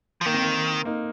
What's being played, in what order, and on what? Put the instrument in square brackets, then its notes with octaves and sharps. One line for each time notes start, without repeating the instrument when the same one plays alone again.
[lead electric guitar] F3
[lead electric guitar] D#3 [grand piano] A#3
[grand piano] C4
A#3
A#3 D#4